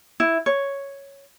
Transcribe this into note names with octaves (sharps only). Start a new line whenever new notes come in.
E4
C#5